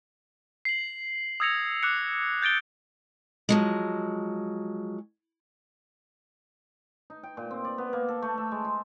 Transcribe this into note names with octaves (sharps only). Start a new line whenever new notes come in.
C7 F#7
D#6 E6 G#6 A#6 C#7 F7
D6 F#6 C#7
G6 A6 D7 G7
F3 F#3 G#3
D#4
G5
A#2
C4
D5
B3
A#3
A4
A3
E5
G#3
C6